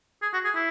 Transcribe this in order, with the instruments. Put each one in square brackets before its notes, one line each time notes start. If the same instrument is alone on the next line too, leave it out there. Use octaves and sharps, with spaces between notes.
[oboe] G#4
F#4
G#4
E4